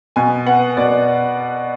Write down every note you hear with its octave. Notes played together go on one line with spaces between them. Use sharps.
B2 G#5
B3 F#5
B2 D5